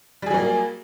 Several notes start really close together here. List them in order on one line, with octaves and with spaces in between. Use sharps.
G3 G#4 F#3 A#3